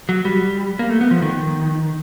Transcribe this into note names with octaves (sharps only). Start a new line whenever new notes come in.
F#3
G3
A#3
A3
B3
F3
D#3